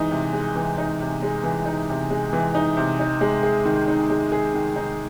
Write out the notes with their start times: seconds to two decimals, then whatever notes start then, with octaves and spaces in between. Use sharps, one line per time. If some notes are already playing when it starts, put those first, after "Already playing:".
Already playing: E3 G#3 D#4
0.11 C3
0.33 G#3
0.55 E3
0.78 D#4
1.00 C3
1.23 G#3
1.44 E3
1.66 D#4
1.89 C3
2.11 G#3
2.33 E3
2.55 D#4
2.77 C3
3.00 D#4
3.21 G#3
3.43 G#4
3.65 D#3
3.88 D#4
4.10 G#3
4.32 G#4
4.54 D#3
4.76 D#4